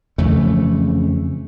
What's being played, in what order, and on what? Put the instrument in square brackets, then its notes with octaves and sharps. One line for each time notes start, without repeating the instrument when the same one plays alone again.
[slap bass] F2 C#3 E3 A3